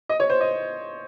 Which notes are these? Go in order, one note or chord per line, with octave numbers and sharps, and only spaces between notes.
D#5
C#5
C5
D#5